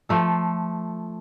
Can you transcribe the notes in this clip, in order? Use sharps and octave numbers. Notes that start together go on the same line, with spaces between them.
F3 A3 A4